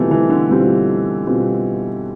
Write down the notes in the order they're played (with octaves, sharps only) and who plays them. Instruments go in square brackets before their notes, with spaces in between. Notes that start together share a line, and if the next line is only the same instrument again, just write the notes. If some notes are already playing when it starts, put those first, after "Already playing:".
Already playing: [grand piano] B2 G3 C4 F4 [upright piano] E3 A3
[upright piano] E3
D3
[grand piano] B2 G3 C4 F4
B2 G3 C4 F4